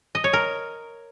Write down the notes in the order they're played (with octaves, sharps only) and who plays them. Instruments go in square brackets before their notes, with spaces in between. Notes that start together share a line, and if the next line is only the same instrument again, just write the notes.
[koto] D#5
C#5
A#4